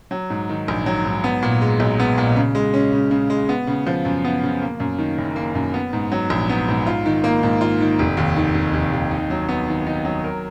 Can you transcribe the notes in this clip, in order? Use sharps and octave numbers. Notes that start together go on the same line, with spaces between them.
F#3
G#2
D#3
A#1
F#3
G#2
B3
A#2
G#3
B1
B3
A#2
C#3
G#3
C#4
C#3
C#3
G#3
B3
C#3
F3
F#2
B3
C#3
A#3
F#2
D#3
F#1
A#3
F#2
B3
G#2
F#3
A#1
B3
G#2
F4
D#3
A#3
G#2
F4
D#3
F1
D#2
D#3
F1
F1
D#2
D#4
F#3
B3
D#3
D#4
F#3
A#4